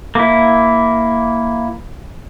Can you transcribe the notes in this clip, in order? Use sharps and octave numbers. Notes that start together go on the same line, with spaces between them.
A#3 E4